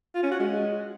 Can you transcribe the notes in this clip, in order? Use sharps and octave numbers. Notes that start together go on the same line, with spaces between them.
F4
C#4
F#4
G#3